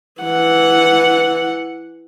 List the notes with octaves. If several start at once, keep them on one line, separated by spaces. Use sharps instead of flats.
E3 F#5